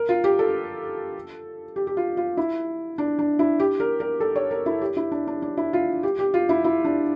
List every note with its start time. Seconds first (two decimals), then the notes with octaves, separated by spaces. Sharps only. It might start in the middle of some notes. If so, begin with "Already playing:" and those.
Already playing: A#4
0.09 F4
0.24 G4
0.39 A4
1.76 G4
1.87 G4
1.97 F4
2.17 F4
2.37 E4
2.98 D4
3.19 D4
3.39 E4
3.60 G4
3.80 A#4
4.00 A#4
4.20 A4
4.35 C#5
4.51 A#4
4.66 E4
4.81 G4
4.97 E4
5.12 D4
5.27 D4
5.42 D4
5.57 E4
5.73 F4
6.03 G4
6.19 G4
6.34 F4
6.49 E4
6.64 E4
6.85 D4